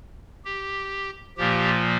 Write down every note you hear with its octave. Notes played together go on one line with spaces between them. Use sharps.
G4
A#2 F3 A#3 G4